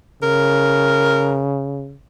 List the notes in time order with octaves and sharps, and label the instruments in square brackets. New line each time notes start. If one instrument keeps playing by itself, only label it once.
[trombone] C#3 [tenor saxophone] A#4